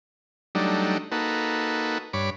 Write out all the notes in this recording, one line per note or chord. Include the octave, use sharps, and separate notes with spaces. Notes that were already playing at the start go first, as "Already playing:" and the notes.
F#3 G3 A3 D4 D#4
A#3 D#4 F#4 A4 B4
G2 C#5 B5 D6